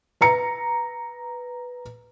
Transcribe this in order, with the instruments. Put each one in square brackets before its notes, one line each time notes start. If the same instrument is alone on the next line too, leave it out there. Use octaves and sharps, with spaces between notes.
[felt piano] B4 A#5 C#7